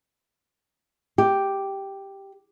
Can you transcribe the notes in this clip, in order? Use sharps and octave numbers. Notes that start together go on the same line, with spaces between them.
G4